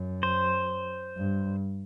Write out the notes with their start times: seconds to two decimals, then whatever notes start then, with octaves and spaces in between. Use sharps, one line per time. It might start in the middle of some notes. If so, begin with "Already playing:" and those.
Already playing: F#2
0.23 C5
1.17 G2